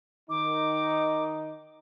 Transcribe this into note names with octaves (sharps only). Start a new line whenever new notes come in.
D#3 D#4 D6